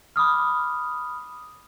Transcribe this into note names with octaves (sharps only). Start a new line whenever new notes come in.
B5 D6 D#6 F6